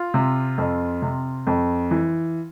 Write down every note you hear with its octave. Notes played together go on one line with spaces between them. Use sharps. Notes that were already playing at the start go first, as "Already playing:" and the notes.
Already playing: F4
C3
F2
C3
F2
E3